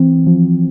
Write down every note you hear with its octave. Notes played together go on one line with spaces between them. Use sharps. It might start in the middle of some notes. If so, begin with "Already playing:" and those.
Already playing: E3 C4
F3